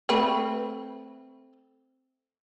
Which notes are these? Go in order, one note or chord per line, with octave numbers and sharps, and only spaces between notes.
A3 C4 B4